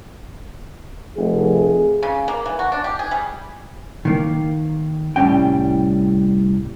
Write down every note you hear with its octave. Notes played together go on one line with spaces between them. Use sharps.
F1 G#4
C#3
A#3
E3
F#4
D4
G4
G#4
G3
D#3 A#3
C2 A2 G3 C#4 G5